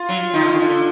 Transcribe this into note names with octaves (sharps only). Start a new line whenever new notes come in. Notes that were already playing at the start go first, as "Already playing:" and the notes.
Already playing: F4
F#3
D#3
D3
D#3
D3